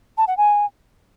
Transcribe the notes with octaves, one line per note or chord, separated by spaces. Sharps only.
A5
F#5
G#5